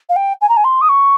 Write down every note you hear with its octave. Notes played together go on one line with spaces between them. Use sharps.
F5
G5
G#5
A#5
G#5
C6
D#6
C#6